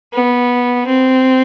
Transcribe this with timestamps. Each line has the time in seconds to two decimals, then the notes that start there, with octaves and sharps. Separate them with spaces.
0.13 B3
0.87 C4